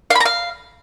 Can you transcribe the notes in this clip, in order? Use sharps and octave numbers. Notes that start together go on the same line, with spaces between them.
F5
B5
A#5
F5